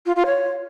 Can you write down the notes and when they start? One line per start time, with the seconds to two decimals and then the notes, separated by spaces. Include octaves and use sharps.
0.06 F4
0.16 F4
0.26 C#5